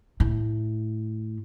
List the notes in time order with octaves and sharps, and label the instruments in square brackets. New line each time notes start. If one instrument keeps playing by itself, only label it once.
[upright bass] A2